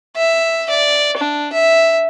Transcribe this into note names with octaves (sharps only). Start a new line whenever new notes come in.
E5
D5
D4
E5